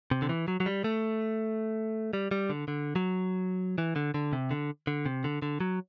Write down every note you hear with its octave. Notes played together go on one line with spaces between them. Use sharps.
C3
D3
E3
F#3
F#3
G3
A3
G3
G3
D3
D3
F#3
E3
D3
D3
C3
D3
D3
C3
D3
D3
F#3